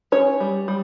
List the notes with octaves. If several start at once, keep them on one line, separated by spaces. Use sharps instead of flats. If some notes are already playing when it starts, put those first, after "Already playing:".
C#4 C#5
G3
G3